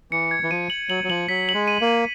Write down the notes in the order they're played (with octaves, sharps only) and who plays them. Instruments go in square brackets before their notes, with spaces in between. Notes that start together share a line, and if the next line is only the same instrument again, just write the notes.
[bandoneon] E3 [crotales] C#7
[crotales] G#6
[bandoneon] E3
[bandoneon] F3 [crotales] D#7
[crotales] F#7
[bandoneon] F#3 [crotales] F#7
[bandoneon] F#3
[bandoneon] F3 [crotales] F#7
[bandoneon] F#3 [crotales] B6
[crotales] F#7
[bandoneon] G#3
[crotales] D#7
[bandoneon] A#3
[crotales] D#7